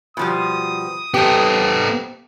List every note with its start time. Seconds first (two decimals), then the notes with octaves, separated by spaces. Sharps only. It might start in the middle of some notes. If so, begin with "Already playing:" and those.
0.17 B2 F3 G3 D#6
1.14 B3 C4 G4 A4